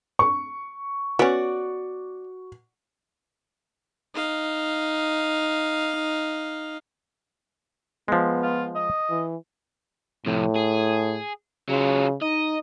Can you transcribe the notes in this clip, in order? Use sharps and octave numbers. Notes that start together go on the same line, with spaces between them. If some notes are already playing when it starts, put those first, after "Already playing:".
C#6
B3 C#4 F#4 D5
D#4 F5
F3 G#3 B3
F4
D#5
E3
F2 A2 C3
G#4
C#3 F#3 F4
D#4 D#5